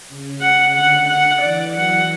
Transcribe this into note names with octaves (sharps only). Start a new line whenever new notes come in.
C#3
C#3 F#5
D3 F#5
F#5
E3 D5
F#3 F#5